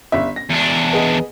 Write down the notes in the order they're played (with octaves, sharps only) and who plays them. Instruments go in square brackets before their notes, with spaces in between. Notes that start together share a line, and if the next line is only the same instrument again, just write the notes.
[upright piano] G1 E5
A#6
[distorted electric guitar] E2 D4
[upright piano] B3 G#4 D#5